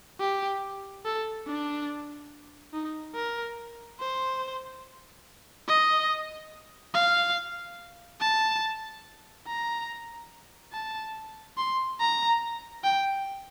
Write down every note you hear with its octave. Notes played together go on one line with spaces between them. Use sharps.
G4
A4
D4
D#4
A#4
C5
D#5
F5
A5
A#5
A5
C6
A#5
G5